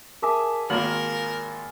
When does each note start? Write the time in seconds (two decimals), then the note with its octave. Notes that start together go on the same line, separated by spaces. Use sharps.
0.22 G#4 A#4 E5 A5 D6
0.70 G#1 A#3 F4 A#4 F#7